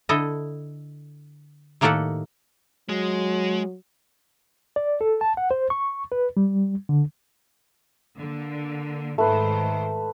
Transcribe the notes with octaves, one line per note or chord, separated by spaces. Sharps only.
D3 E4 A4 D#5
A2 D#3 A#3 G4 A4 F#5
F#3 G#3
D5
A4
A5
F#5
C5
C#6
B4
G3
D3
D3 A#3
G#2 D#3 A3 B4 C5